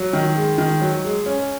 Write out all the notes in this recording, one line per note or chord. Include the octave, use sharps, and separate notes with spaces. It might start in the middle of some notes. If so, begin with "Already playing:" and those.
Already playing: F#3
D#3
G#3
D#3
F#3
G#3
C#4